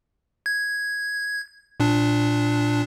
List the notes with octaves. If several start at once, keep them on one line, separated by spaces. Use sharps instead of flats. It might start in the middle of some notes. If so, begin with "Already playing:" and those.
G#6
A#2 D4